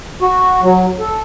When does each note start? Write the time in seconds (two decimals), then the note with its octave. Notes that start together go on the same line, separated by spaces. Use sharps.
0.22 F#4
0.63 F#3
0.99 A4